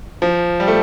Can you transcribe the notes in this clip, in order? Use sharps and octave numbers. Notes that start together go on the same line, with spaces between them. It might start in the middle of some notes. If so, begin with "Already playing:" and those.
F3
G3
A3